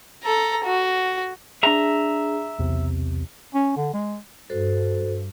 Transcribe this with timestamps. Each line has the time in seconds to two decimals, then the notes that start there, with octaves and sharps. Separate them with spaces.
0.23 A4 A#5
0.65 F#4
1.63 D4 G#4 E5 A#5
2.59 B1 E2 C3
3.54 C#4
3.76 D3
3.93 G#3
4.50 G2 F#4 A4 C5